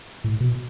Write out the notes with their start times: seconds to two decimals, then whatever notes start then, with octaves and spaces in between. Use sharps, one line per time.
0.24 A2
0.40 B2